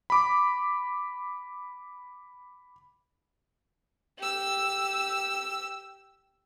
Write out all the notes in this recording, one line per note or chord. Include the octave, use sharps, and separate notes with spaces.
B5 D6
G4 E6